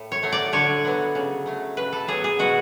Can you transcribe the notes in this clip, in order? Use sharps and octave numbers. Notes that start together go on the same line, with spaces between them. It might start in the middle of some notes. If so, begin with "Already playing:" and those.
Already playing: A2
C#5
F#3 A3
D5
D3 C#5
F#3 B3
C#3
F#3 A3
C#3 B4
A4
F#3 B3 G#4
G#4
B2 F#4